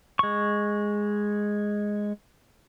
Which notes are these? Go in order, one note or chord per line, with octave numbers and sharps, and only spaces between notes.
G#3 C#6